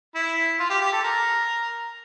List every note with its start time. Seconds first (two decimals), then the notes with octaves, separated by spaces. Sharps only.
0.15 E4
0.59 F4
0.70 G4
0.81 G4
0.93 A4
1.04 A#4